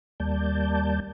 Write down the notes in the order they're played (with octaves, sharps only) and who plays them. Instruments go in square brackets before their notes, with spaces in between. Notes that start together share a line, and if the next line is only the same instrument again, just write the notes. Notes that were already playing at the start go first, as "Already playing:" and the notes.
[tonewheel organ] D#2 G3 A#3 D5 A5 G6